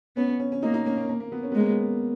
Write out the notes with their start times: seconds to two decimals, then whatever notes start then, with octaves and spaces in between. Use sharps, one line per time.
0.16 B3 C#4
0.29 C#4
0.40 C#4
0.52 C#4
0.63 A#3 D#4
0.74 D#4
0.86 C#4
0.97 A#3
1.09 A#3
1.20 A#3
1.32 B3
1.43 C#4
1.52 G#3 B3
1.60 A#3
1.69 B3